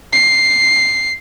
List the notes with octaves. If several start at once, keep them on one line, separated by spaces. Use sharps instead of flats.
C7